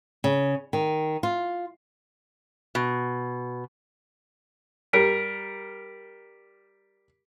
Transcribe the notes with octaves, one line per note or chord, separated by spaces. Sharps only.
C#3
D#3
F4
B2
G3 A#4 B6 D7